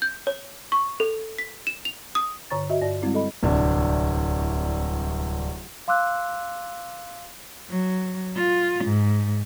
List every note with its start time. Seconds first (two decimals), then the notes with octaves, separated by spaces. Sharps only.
0.02 G6
0.27 C#5
0.72 C#6
1.00 A4
1.38 B6
1.67 E7
1.85 F7
2.15 D#6
2.50 G2 D3 C#5 A#5 C#6 A6
2.70 F#4 D#5 E5
2.82 G2 D5 A#6
3.02 G3 G#3 C4 E4
3.14 A4 D#5 B5
3.43 D1 C2 D4
5.88 F5 C6 D6 E6 F#6
7.68 F#3
8.35 F4
8.84 G#2